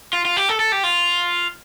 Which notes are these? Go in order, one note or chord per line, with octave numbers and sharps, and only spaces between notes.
F4
F4
G4
A4
A4
G4
F4